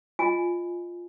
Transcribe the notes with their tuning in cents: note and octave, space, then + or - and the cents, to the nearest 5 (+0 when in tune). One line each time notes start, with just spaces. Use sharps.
F4 +0 D#5 +0 G#5 +0